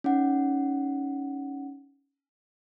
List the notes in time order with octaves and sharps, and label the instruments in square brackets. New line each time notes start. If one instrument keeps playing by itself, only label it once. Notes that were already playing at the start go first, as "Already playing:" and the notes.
[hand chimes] C#4 D#4 F#5